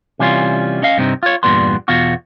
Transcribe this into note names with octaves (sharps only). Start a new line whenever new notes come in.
C3 E3 G3 C#4 F4
C#4 D#5 F5
G2 C3 C4 D#4
F4 C#5
E2 G2 A#2 G3 B3 C6
E2 B2 F4 F#4